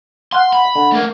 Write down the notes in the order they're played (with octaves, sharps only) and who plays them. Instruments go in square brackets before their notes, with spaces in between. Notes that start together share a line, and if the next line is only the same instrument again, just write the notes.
[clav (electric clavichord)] F5 F#5 [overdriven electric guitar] C6
[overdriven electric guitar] B5
[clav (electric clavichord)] D3
[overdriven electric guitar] A3 A#4